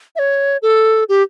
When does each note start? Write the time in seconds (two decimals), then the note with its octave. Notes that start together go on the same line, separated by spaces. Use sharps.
0.16 E5
0.19 C#5
0.62 A4
1.09 G4